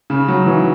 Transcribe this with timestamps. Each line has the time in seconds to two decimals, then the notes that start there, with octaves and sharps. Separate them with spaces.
0.10 C#3
0.28 F#3
0.46 E3